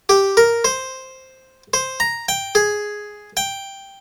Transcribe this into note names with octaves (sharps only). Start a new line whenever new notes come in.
G4
A#4
C5
C5
A#5
G5
G#4
G5